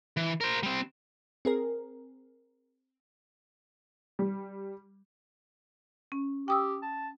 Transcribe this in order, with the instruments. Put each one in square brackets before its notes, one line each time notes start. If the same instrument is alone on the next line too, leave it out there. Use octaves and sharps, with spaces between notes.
[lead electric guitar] E3
A#4 C5
G3 C4
[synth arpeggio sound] C4 G#4 A#4
[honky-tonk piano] G3
[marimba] C#4
[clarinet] G4 [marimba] G5 D#6 E6
[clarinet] A5